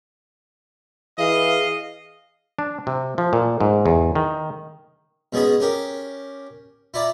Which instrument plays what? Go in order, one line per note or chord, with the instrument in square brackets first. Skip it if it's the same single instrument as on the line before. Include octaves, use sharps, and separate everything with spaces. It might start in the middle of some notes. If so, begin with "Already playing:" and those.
[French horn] E3 [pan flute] G#4 [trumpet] D#5 [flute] F5
[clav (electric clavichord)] D4
C3
F3
A#2
G#2
E2
D#3
[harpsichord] B2 G#3 B3 C#4 G#4
C#4 G4 A#4
E4 F4 D5 A#5